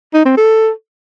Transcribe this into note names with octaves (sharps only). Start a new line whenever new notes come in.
D#4
C4
A4